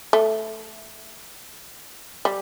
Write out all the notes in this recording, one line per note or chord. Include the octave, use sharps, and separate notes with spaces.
A3
G3